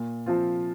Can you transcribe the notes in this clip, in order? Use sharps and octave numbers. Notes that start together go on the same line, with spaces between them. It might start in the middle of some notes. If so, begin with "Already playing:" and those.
Already playing: A#2
F3 C4 F4